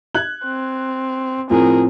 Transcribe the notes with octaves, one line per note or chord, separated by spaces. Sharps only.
F#6 G#6 F#7
C4
A2 F3 C4 G#4 A#4